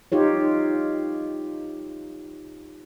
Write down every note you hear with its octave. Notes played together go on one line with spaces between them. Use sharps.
D#4 F4 G4 C#5